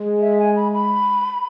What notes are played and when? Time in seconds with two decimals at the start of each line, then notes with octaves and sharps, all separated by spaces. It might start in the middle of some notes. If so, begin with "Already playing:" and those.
Already playing: G#3
0.21 E5
0.39 G#5
0.56 B5
0.74 B5